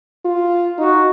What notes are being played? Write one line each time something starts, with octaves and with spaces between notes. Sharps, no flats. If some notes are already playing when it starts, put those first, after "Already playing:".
F4
D#4 F#4